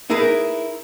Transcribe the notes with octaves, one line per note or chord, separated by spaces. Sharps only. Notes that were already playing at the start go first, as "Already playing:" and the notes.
D#4 E4 G#4 A#4 B4